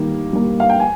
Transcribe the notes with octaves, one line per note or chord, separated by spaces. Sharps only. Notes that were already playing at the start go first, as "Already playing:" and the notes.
Already playing: D#3 G3 A#3
G3 A#3
F5
G5
G#5